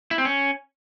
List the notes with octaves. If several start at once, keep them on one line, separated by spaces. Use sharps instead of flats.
E4
C4
C#4